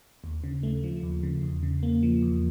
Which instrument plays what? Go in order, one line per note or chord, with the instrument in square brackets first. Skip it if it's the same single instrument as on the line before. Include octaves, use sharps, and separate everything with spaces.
[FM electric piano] D#2
C#3
A3
F3
D#2
C#3
E2
C#3
A#3
F3
E2